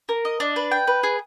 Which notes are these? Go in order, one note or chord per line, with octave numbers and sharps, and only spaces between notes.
A#4
D#5
D4
B4
G5
B4
G#4